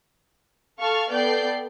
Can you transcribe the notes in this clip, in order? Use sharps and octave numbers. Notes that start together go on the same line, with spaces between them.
A4 F5 A5 C#6 F6
B3 A4 D5 G5 G6 C7